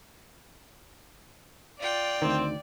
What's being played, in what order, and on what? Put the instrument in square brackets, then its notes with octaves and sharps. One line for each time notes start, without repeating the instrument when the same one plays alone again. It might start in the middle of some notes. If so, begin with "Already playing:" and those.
[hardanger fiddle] F4 G5 [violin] D5
[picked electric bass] D2 D#3 [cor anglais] C4